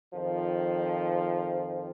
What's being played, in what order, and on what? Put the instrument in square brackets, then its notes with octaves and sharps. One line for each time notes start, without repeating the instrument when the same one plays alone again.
[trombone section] F2 D#3 F3